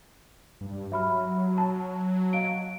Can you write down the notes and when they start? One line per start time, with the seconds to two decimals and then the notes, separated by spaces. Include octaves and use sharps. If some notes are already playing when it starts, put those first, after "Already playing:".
0.61 G2
0.92 F#3 E5 B5 F6
1.58 A5
2.33 D#5 F5 D7